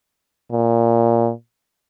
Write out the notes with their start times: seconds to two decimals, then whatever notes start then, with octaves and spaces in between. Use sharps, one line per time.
0.51 A#2